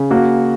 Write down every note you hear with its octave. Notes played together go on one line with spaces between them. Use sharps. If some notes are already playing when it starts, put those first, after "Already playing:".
Already playing: C#3
A#3 F#4